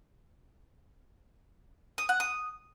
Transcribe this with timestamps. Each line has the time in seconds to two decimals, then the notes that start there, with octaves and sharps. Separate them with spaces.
1.98 D#6
2.09 F#5
2.20 D#6